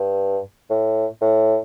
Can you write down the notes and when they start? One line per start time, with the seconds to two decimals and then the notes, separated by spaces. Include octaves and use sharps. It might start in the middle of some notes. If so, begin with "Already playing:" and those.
Already playing: G2
0.70 A2
1.21 A2